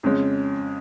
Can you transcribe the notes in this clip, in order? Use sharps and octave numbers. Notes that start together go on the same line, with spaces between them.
F2 C#3 G#3 C#4